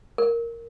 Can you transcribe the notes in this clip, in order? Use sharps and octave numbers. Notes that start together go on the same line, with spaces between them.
A#4